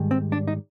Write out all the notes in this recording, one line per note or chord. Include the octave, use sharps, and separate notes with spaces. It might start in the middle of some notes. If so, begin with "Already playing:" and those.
Already playing: G#2 D#3 G3
C4
D4
D#4